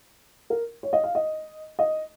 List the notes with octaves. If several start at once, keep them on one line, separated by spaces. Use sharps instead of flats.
A#4
C#5
D#5
F5
D#5
D#5